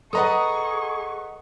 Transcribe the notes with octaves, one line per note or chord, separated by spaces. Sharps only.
G#4 A4 B4 D#5 F#5 A#5 C#6 D#6